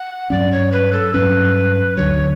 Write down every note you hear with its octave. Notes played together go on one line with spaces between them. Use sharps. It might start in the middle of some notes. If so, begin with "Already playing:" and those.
Already playing: F#5
G2 F#3 C#4 D5
C#5
B4
A4
G2 F#3 C#4 B4
D2 D3 F#3 C#5